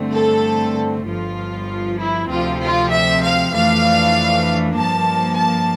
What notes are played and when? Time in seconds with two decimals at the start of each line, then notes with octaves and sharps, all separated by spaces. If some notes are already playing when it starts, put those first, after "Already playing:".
Already playing: G2 D3 A3 C4
0.14 A4
1.06 G1 G2 F3 F4
1.98 E4
2.29 D2 C3 F3 C4 F4
2.60 F4
2.91 E5
3.21 F5
3.52 F2 E3 A3 D4 F5
4.75 G2 F3 A#3 A5
5.37 A5